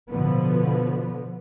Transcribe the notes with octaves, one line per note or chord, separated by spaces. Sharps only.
B2 D3 F3 B3